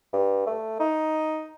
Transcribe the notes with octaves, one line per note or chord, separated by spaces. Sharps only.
G2
A3
D#4